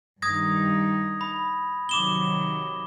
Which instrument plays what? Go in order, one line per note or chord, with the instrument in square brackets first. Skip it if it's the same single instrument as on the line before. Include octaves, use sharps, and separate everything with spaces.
[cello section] G2 D#3 D#4 [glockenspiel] D#6 G#6 A#6
[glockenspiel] B5
[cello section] C3 D#3 F#3 [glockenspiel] D6 E7 G7